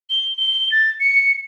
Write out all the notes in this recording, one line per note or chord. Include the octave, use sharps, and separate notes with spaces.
G7
G7
A6
C#7